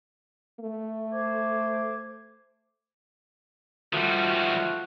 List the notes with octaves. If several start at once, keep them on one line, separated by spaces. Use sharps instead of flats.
A3
C5 D6 G#6
D#3 F3 G3 A3 F#4